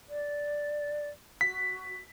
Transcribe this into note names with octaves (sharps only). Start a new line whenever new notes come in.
D5
F#4 B6